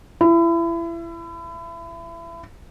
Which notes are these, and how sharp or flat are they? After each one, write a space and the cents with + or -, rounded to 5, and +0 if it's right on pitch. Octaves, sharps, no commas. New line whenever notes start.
E4 +30